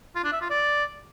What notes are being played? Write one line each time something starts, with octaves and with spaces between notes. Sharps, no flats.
F4
D4
E5
F4
D5